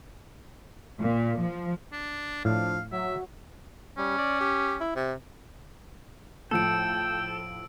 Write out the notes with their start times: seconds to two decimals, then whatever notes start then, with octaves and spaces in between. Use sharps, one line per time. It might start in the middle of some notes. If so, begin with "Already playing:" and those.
1.01 A#2
1.40 F3
1.92 D4
2.45 A2 F3 D4 F5
2.92 F#3 E5
3.98 G3 C#4
4.18 D5
4.40 G4
4.80 E4
4.95 C3
6.51 A2 F3 A4 G5 E6 D7